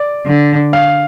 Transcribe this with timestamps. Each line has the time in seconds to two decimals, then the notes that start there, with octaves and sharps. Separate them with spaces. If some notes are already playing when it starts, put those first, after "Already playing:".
Already playing: D5
0.26 D3
0.73 F5